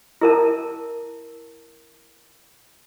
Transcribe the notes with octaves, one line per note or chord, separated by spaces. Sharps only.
E4 A#4 A5